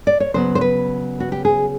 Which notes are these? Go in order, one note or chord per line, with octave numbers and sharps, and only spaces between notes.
D5
C#5
C#3 F#3 B3 C5
C5
B4
F#4
G4
G#4